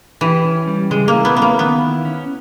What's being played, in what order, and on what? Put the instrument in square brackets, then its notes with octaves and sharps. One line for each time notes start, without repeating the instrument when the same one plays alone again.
[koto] E3 [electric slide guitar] G4
[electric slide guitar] C#4
G3
[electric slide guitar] C#3 [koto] G#3
[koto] A#3
[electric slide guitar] E4
[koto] B3
[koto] B3 [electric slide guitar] C#4
[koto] A#3
[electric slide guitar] D#3 [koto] B3
[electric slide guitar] E4
C#4